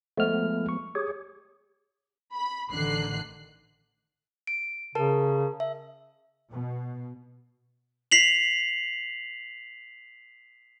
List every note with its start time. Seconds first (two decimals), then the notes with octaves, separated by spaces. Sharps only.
0.18 F3 G#3 A3 B3 F6
0.69 C#6
0.95 G4 G#4 C#5
2.33 B5
2.71 A1 D3 D#3 F#6 C7
4.47 D7
4.95 C#3 A#4 A5
5.60 E5
6.51 B2
8.11 B6 C7 F7 F#7